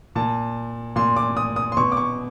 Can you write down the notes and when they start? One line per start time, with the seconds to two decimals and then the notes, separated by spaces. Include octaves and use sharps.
0.15 A#2 A5
0.96 A#2 C6
1.17 D6
1.37 D#6
1.56 D#6
1.72 C6
1.77 B2 C#6
1.92 D6
1.97 C#6